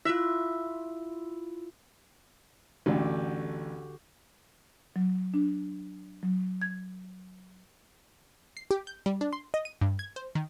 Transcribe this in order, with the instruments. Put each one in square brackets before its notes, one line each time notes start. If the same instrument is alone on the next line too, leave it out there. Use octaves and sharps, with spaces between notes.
[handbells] E4 F4 [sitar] E5
[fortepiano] A1 D2 A3 [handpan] D3 F#4 G4
[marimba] F#3
D4
F#3
G#6
[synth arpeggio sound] C7
G4
G6
G3
D4
C6
D#5
D#7
G2
G#6
C5
D#3